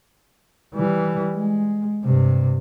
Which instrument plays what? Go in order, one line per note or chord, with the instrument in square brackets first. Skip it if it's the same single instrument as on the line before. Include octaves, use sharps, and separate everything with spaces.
[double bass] E3 G3
G#3
G2 C3